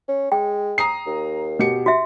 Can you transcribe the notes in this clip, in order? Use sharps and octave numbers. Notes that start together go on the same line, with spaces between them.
C#4
G#3 G5
A#5 D#6 C7
D#2
B2 G4 C#7
F#4 E5